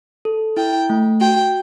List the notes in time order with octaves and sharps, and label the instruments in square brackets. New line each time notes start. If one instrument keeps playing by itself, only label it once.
[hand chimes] A4
[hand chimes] E4 [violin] G5
[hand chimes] A3
[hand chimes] F#4 [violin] G5